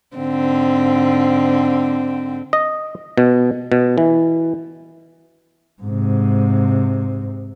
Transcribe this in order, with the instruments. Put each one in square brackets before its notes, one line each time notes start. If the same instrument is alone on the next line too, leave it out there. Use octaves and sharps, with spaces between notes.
[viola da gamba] G#2 D3 C4
[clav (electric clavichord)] D#5
B2
B2
E3
[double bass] G#2 C3